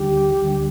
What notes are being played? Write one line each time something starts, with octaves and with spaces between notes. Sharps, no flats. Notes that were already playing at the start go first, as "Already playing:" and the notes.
Already playing: D2 D3 G3 G4
D2 D3 G3